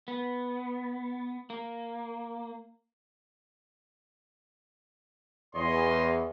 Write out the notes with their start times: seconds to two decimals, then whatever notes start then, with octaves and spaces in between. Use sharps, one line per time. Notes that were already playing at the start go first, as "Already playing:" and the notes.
0.08 B3
1.50 A#3
5.54 E2 C#5 D#5 C6